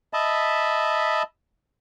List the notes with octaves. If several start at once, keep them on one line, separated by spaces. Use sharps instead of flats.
D#5 E5 A5 B5